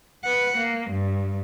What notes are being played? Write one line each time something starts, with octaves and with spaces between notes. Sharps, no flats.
B4 F#5
A#3
G2